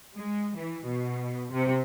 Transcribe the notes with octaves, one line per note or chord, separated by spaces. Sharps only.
G#3
E3
B2
C3